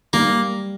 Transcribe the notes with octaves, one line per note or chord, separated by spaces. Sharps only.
G3 A#3